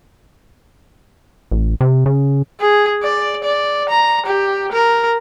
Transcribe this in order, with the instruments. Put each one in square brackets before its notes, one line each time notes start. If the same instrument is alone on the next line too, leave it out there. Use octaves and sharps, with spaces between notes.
[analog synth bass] A1
C3
C#3
[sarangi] G#4
D5
D5
A#5
G4
A#4